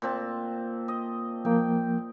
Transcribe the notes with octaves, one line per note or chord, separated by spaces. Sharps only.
A#2 C4 A5
D#5
F3 A#3 G5